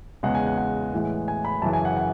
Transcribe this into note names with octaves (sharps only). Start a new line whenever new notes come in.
E2 C#3 G#3 F#5
G#5
F#5
F#5
A2 E3 G#3
G#5
B5
F#2 C#3 E3 A5
G#5
F#5
F#5